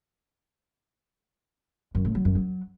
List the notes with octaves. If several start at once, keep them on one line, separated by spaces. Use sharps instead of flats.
F#2
A2
F#3
F#2
F#3